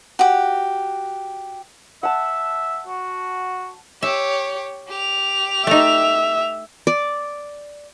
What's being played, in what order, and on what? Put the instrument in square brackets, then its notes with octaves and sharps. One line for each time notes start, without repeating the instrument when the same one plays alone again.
[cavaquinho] F#4 G4
[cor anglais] E5 [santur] F#5 A5
[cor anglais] F#4
[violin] G4 C#5 [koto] E5
[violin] G4 F7
[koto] A3 D#4 [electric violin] E5
[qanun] D5